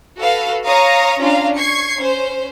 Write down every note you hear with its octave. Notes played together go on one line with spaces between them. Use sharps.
F#4 A4 B4 F5
C#5 F5 A#5 C#6 D#6 A#6
C#4 D4 F4 F5 A#5
C#6 G#6 C7 C#7
C#4 C5